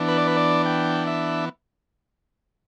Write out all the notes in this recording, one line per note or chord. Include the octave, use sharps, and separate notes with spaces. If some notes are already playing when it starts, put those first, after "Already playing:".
Already playing: E3 B3 D4
B4
D5
B4
D5
G5
E5